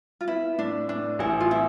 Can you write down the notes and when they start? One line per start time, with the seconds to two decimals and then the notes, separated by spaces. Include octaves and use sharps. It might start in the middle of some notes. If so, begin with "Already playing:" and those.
0.21 F4
0.28 B3 E4
0.58 A2 D4
0.88 A2 D4
1.19 A1 E4
1.40 F4
1.51 B3 E4